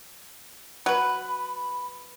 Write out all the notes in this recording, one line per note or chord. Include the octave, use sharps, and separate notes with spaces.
F#3 B4 B5